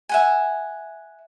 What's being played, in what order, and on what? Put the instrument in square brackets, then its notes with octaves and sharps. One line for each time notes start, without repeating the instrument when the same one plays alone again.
[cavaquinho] E5 F#5 G#5